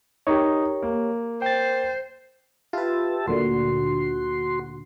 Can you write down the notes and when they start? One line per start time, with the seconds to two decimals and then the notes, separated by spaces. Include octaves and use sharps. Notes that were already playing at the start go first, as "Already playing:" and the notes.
0.27 D#4 G4 A#4 C#5
0.83 A#3
1.42 C5 G5 A6
2.73 F4 G4 B4 E5 A5
3.28 D2 A#2 D3 F#4 C6